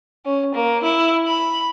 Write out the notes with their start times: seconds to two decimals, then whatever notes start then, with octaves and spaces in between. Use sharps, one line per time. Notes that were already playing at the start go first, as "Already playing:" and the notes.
0.25 C#4
0.54 A#3
0.83 E4
1.26 B5